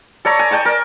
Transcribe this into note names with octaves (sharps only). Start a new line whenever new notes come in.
A4 C#5 D5 A#5
G#5
D5 G5 A5 C#6
A#4